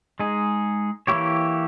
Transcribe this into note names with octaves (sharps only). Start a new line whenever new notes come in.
G#3 D#4 G#4
E3 A#3 E4 G4 C#5